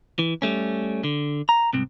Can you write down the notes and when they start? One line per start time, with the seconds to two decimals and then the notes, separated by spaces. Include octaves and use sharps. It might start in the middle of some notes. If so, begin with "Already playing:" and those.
0.19 E3
0.42 G3 A3 C#4
1.04 D3
1.49 A#5
1.73 C2 G#2 C4